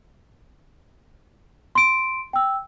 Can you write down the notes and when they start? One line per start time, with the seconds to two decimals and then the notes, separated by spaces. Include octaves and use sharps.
1.75 C6 D7
2.33 G5 E6